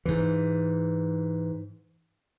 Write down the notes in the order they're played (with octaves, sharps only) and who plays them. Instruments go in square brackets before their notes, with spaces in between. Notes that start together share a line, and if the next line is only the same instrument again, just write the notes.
[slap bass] G#2 E3